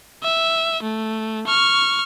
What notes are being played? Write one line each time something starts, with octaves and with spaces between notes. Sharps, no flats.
E5
A3
C#6 F6